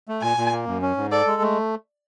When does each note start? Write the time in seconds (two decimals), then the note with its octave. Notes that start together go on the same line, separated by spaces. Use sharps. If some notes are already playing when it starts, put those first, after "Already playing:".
0.08 A3
0.22 A#2 G#5
0.37 A#2
0.52 A#3
0.67 F#2
0.82 C#4
0.97 G#2
1.12 A4 D5
1.27 G#3
1.42 A3